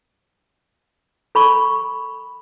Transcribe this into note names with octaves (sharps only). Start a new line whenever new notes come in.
A4 B5 C#6